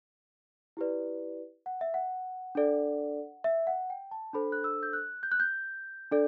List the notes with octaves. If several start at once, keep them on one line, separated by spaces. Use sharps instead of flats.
E4 G4 B4 D5
F#5
E5
F#5
D4 A4 D5
E5
F#5
G5
A5
D4 A4 C5 B5
F#6
E6
G6
F#6
G6
F#6
G6
D4 A4 D5